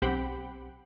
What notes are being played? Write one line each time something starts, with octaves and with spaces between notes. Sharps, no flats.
B1 C4 G4 F#5 G5 B5